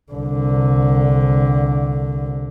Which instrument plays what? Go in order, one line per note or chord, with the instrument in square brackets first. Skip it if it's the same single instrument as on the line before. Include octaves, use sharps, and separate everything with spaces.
[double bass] C2 D3